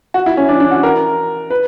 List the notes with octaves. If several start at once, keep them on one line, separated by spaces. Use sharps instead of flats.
F#4
E4
C#4
D4
D4
F#4
A#4
B4